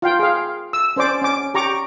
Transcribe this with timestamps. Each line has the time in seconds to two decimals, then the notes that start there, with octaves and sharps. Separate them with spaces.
0.02 F4 F5 G5
0.19 G#4 F5
0.73 E6
0.96 C#4 C5 D5 D6
1.22 C#4 D6
1.54 G4 A#5 C#6 D6